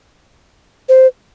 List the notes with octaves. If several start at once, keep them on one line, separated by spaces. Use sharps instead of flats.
C5